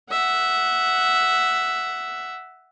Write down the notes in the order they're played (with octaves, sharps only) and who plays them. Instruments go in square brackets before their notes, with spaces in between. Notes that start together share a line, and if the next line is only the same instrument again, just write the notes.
[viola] E5 F#5